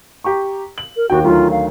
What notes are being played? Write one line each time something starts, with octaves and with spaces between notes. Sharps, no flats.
G4 A#5 C#6
F#7
A#4
D#2 D#3 F#4 G5
D2 D#3 F#3 F4
F5